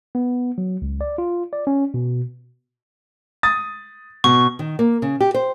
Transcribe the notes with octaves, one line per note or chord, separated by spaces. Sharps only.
B3
F#3
C#2
D5
F4
D5
C#4
B2
D#6 A6
B2 C#6
D#3
A#3
C#3
G4
C5